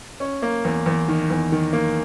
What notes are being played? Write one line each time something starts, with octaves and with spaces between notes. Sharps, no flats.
C#4
A#3
E2
E2
D#3
E2
D#3
A#3